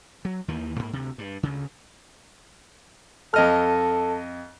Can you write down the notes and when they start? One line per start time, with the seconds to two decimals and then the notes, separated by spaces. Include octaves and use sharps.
0.25 F#3
0.48 D#2 D#3 E3 A#3
0.79 G#2 A#3
0.93 D2 C3
1.18 G2
1.43 D2 C#3
3.34 F2 A4 D#5 F6